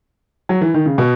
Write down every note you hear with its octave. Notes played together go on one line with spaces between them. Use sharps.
F#3
E3
D#3
C#3
B2